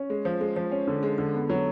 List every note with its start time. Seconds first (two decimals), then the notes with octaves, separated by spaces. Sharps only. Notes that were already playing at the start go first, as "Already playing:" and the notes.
Already playing: C#4
0.10 G#3
0.25 F3
0.41 G#3
0.56 F3
0.71 C#4
0.88 D3
1.03 G#3
1.18 D3
1.34 B3
1.50 F#3